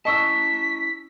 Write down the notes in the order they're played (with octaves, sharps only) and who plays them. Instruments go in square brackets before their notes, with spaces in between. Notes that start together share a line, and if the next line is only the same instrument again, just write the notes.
[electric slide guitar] C#4 E4 A5 [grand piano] D#5 C#6 E6 [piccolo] B6